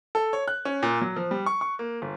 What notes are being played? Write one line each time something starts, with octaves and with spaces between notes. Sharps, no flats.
A4
C#5
F#6
C#4
A#2
F#3
F3
G3
C#6
C#6
A#3
G1